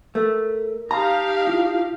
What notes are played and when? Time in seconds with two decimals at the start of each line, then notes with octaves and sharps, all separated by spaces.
0.15 A3 A#4
0.91 D#4 G4 F5 A5 A#5 D#6
1.47 E4 F4